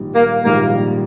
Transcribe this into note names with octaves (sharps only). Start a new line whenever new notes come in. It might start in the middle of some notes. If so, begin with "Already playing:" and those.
Already playing: A#1 G#2 D#3 G3
A#3
A#1 G#2 D#3 G3 A#3